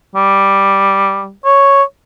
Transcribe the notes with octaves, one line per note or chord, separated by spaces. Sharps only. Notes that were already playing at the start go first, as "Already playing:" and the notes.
G3
C#5